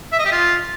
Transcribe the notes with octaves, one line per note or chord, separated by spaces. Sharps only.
E5
D#5
G4
F4